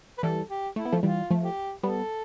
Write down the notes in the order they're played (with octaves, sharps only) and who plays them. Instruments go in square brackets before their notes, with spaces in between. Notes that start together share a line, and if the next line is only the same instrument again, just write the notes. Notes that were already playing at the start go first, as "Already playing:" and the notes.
[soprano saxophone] B4
[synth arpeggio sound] E3 G3 [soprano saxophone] A4
[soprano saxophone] G4
[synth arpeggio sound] A3 [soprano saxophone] E4
[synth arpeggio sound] B3
F3 A3
[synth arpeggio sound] E3 G3 [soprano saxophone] F4
[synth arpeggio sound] F3 A3
[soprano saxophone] G4
[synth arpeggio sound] G3 B3 [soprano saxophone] A4